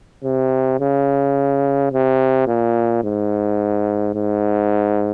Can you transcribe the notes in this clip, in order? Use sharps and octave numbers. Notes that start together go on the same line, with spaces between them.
C3
C#3
C3
A#2
G#2
G#2